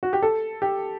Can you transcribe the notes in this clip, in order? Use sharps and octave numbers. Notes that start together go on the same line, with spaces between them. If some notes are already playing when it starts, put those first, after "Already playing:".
F#4
G4
A4
G4